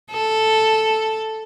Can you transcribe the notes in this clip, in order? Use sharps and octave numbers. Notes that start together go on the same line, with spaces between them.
A4